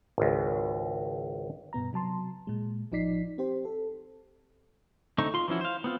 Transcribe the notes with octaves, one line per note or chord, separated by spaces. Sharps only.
G#1 C#2
G2 B2 B3 A#5
C3 F#3 A5 C6
A#2 G#3
A1 F3 D#4 D5 B6 C7
C4 G4 C5
A4
D3 A3 C4 D#4 C#6
F4 C6
E3 F3 C#4 E4 F#4
C5 F5
B3 C4 F4